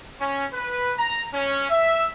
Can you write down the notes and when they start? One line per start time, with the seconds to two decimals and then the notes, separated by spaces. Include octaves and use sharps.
0.20 C#4
0.53 B4
0.98 A#5
1.33 C#4
1.70 E5